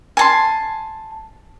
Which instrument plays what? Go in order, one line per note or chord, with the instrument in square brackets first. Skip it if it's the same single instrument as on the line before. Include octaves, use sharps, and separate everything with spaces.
[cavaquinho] G#5 A5 C6